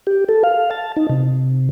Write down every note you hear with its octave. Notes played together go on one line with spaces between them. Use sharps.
G4
A4
F5
A5
D#4
C3